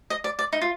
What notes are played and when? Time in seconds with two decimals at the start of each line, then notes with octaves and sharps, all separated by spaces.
0.10 D#5
0.24 D5
0.39 D5
0.53 D#4
0.61 F4